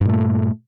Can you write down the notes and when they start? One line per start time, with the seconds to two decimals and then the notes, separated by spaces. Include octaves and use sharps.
0.01 G2
0.05 A#2
0.09 A3